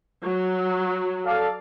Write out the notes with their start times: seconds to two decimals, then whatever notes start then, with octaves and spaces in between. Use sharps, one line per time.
0.23 F#3
1.25 A4 D5 F5